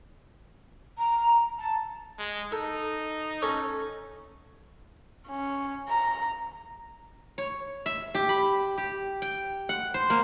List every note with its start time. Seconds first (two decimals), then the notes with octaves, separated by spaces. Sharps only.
0.97 A#5
1.59 A5
2.18 G#3
2.52 D#4 A4
3.42 C#4 A4
5.28 C#4
5.89 A#5
7.38 C#5
7.86 E5
8.14 G4
8.29 B5
8.78 G4
9.22 G5
9.69 F#5
9.94 C5
10.10 A#3